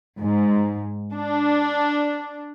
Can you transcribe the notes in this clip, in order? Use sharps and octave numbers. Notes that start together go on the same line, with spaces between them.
G#2
D4